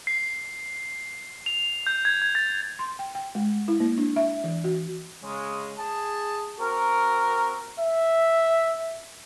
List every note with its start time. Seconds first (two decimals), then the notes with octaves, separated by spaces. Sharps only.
0.07 C7
1.46 F7
1.87 G6
2.05 G#6
2.22 G#6
2.35 A6
2.79 C6
2.99 G5
3.15 G5
3.35 G#3
3.68 E4
3.80 A#3
3.98 D4
4.16 E5
4.44 E3
4.64 F#4
5.23 C#3 G#3
5.77 G#4 A5
6.59 C4 F#4 A#4
7.80 E5